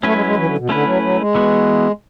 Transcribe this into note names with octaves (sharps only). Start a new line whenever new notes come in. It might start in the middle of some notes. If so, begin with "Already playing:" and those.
F#3 A3 C#4 E4 B4
G#3
G#3
E3
D3
B2
D3 A3 C#4 E4 B4
F#3
F#3
G#3
E3 B3 F#4